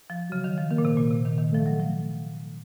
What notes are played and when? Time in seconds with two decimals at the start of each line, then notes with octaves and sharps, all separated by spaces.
0.10 F3
0.30 C#3 F#3
0.44 D#3
0.58 F3
0.71 D#3 A#3
0.78 A#2
0.85 C3
0.97 A#2
1.11 C3
1.25 D#3
1.38 D#3
1.52 F3 A3
1.66 F#3
1.80 F3